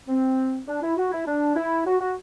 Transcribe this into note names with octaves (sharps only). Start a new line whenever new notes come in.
C4
D4
E4
F#4
E4
D4
E4
F#4
F#4